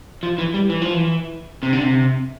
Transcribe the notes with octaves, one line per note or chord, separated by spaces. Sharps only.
F3
E3
G3
E3
F3
E3
C3
D3
C3